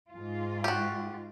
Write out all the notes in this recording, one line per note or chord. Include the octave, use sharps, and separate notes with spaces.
G#2 F4
F#4 G4